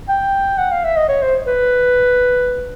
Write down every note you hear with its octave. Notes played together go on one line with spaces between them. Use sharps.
G5
F#5
F5
E5
D#5
C#5
C5
B4